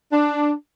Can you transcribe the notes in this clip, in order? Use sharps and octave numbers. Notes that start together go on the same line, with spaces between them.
D4